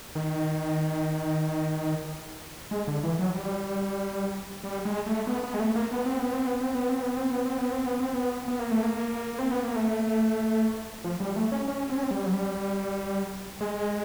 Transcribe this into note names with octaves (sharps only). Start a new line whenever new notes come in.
D#3
G#3
D3
E3
F#3
G3
G3
G#3
A3
B3
B3
G#3
A3
A#3
B3
C4
B3
C4
B3
C4
B3
C4
B3
C4
B3
C4
B3
C4
B3
C4
B3
B3
A#3
A3
A#3
C4
B3
A#3
A3
F3
G3
A3
C#4
C#4
C4
C#4
C4
G3
F#3
G3
G#3